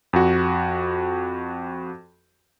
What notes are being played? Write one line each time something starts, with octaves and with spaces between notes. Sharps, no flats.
F2 F#4